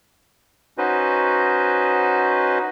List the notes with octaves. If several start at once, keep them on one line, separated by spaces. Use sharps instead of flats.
C#4 D#4 F#4 B4 C5 D#5